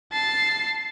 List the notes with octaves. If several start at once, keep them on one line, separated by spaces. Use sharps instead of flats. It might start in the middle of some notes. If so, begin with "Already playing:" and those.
A5 C7